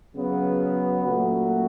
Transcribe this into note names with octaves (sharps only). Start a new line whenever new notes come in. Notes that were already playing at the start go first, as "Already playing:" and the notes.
C#3 F#3 B3
A#2 F#3 A3 C#4 F#4